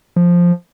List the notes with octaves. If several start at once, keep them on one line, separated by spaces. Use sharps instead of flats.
F3